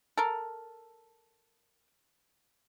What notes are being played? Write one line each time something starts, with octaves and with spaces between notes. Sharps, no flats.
A4 A#4